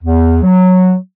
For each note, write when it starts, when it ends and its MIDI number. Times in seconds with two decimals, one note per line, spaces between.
0.04 0.38 40
0.43 0.94 54